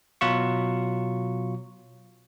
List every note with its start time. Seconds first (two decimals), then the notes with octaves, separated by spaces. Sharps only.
0.21 B2 F#3 F4 C#6